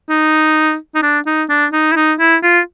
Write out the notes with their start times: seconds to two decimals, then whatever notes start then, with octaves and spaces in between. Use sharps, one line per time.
0.10 D#4
0.95 D#4
1.02 D4
1.26 D#4
1.49 D4
1.73 D#4
1.92 E4
1.96 D#4
2.20 E4
2.43 F4